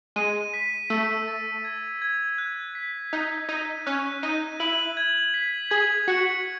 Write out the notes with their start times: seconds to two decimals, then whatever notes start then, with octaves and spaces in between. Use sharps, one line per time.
0.16 G#3 D#7
0.54 B6
0.90 A3 E6
1.28 A6
1.65 G#6
2.02 G#6
2.38 F#6
2.75 B6
3.13 D#4 F#6
3.49 D#4 D#7
3.86 C#4 F#6
4.23 D#4 D#7
4.60 E4 F#7
4.97 G#6
5.34 B6
5.71 G#4 G#6
6.08 F#4 C#7